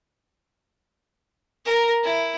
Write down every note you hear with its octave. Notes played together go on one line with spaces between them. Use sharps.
A#4
E4